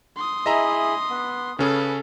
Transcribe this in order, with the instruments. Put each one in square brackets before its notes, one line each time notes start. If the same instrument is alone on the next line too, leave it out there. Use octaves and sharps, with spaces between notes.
[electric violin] C6 D#6
[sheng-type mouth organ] E4 G#4 [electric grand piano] D#5 E5 A#5
[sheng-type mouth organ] B3
[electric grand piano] C#3 C#4 G#4 [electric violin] A4 [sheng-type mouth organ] B4